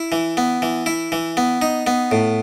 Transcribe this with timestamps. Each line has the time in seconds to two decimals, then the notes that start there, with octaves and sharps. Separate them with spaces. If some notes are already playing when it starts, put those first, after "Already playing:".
Already playing: E4
0.12 E3
0.37 B3
0.62 E3
0.86 E4
1.12 E3
1.37 B3
1.62 D#4
1.87 B3
2.11 A2